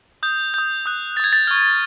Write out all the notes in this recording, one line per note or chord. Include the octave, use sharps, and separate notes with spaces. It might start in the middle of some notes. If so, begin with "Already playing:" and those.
D#6 G6
D#6 G6
D#6 F#6
D#6 F#6 G#6 A6
A6
C#6 F6